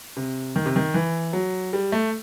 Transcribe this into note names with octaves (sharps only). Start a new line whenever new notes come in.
C3
D#3
C3
D#3
E3
F#3
G3
A3